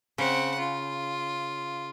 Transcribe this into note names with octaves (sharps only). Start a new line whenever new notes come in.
C#3 C4 F#5
F4